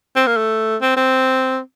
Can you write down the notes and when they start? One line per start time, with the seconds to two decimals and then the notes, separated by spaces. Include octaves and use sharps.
0.16 C4
0.27 A#3
0.37 A3
0.81 C4
0.96 C4